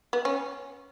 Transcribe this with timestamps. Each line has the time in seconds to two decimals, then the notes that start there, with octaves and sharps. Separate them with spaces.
0.13 B3
0.25 C#4